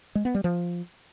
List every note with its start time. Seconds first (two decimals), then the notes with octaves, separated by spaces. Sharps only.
0.15 G#3
0.25 B3
0.35 G3
0.44 F3